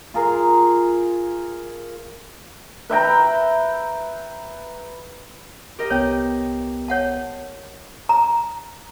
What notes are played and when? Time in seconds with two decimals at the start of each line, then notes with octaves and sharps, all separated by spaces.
0.14 F4 G#4 A#4
2.90 B4 E5 G5 A#5
5.79 G4 A#4 D#5
5.90 C2 B3 C#5 G5
6.88 C#5 F#5 A5
8.09 A#5